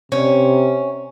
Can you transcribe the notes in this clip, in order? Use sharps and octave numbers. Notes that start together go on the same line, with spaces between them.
C3 C#4